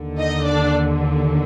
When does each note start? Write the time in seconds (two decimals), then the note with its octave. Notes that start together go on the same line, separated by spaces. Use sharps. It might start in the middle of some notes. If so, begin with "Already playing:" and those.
Already playing: D#2 D3
0.19 D#4 D#5
0.46 D4 D5